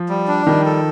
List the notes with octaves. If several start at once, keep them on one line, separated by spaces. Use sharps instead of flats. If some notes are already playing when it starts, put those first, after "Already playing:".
Already playing: F3
G3
D4
D#3 G3
A4